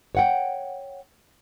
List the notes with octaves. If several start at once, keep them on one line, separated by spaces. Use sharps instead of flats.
C#5 F#5 G5